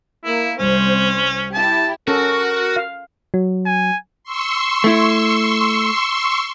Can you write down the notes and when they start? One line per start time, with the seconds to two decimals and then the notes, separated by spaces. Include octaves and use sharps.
0.24 A#3 E4
0.59 C2 C#4 C5
1.53 E4 G4 A5
2.08 C#4 F#4 A4 A#4
2.76 F5
3.34 F#3
3.66 G#5
4.24 C6 C#6 E6
4.84 A3 E4